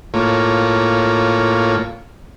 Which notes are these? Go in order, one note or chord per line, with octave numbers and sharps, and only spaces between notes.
A2 A#3 F4 C#5